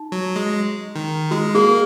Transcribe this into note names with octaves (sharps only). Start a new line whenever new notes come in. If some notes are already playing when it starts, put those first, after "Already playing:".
Already playing: D#4
F#3
G#3
D#3
G#3 F#4
A#3 G#4